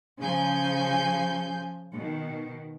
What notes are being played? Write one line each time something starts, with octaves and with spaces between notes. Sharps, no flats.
C#3 F3 G#5 G6
B2 D#3